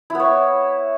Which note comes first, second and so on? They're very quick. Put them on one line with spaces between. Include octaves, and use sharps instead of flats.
E4 B3 C#5